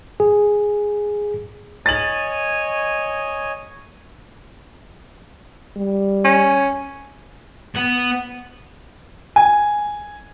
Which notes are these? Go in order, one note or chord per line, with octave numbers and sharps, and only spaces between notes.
G#4
C#5 D#5 G#5 A6 F#7
G3
C#4
B3
G#5